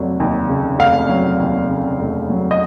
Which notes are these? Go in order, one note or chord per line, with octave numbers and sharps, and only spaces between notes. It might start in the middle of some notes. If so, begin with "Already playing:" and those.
Already playing: F1 F#3
D#2
C#3
F1 F5
F#3
D#2
C#3
F1
F#3
D#5